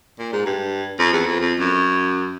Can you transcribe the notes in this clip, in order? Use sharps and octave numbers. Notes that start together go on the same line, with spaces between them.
A#2
G#2
G2
F2
E2
F2
F2
F#2